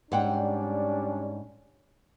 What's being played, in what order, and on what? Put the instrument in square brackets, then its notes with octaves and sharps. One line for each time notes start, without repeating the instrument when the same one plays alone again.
[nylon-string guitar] G#2 F#5 G5 [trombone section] G3 C#4 D4